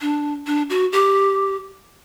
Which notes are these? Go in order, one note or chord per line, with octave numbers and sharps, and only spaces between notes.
D4
D4
F#4
G4